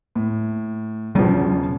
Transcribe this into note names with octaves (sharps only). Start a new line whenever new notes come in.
A2
E1 C#3 F3 F#3 D4